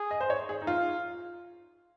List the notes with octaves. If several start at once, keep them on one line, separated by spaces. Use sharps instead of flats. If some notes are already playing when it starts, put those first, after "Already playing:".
Already playing: G#4
D#5
C5
C#5
G#4
D#4
F4